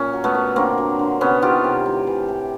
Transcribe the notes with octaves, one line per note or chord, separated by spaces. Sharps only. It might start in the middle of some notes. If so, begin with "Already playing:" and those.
Already playing: A#2 C#4
F#3
A3 B3
A#2
D3 A#3 C4
F#3
D3
C3 B3 C#4
D#3 F4 G4
C3
A2
E3
A2